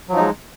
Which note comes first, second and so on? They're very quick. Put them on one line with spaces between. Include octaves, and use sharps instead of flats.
F#3 F3 D#4 G#3